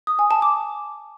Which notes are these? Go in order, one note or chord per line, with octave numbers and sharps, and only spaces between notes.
D#6
G#5
A5
D6